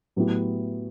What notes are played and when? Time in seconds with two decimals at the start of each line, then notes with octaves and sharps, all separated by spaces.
0.16 A2 F#3 B3 E4 G4